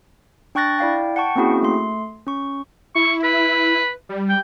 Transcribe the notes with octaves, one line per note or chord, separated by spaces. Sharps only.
D4 G5 C#6 F#6 A6 A#6
E4 D5 F5 G5
F#5 G5 A5 C#6
A#3 C4 C#4 E4 F#4 G#4
A3 C6
C#4 C#6
E4 C#6
B4
G3
G5